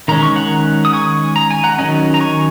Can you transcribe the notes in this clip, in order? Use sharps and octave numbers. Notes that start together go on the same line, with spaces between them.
D#3 G#3 C#4 A#5
C#6
F#5 A#5
D#6
G#5 C#6
A#5
G#5
F#5 A#5
D#3 F#3 C#4 D#5 G#5
A#5
G#5 C#6